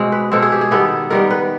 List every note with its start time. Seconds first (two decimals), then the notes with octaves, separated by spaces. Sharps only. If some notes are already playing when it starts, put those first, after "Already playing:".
Already playing: B2 G#3 C4
0.12 B4
0.32 B2 G#3 C4 A4
0.42 G#4
0.52 G4
0.61 G#4
0.71 D#3 G3 B3 A4
1.10 D#3 G3 B3 A#4
1.31 B4